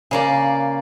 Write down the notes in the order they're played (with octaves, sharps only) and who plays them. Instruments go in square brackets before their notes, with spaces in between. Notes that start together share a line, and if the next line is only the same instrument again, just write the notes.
[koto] C#3 A#3 D5